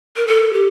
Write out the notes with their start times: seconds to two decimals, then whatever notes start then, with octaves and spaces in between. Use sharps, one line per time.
0.16 A#4
0.27 A4
0.53 G4